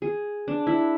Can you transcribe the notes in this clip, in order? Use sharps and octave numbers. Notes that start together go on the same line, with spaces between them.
G#4
D4
E4